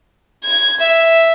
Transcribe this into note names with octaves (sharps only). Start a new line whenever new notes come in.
G#6
E5